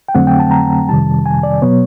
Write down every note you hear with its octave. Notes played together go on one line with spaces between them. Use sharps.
G5
F2 D3 F#3 A3 C4 F#5
G5
A5
A#5
F2 C3 D#3 G3 A5
G#5
D5
B2 F#3 B3 C#5